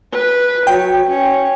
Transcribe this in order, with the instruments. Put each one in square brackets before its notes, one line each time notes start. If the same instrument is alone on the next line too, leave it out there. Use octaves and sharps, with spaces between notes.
[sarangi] B4
[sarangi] F#3 [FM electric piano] G5
[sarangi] C#4